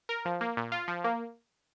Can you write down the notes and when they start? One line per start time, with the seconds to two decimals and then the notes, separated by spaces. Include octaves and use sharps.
0.09 A#4
0.25 F3
0.41 A#3
0.57 A#2
0.72 F4
0.88 F3
1.04 A#3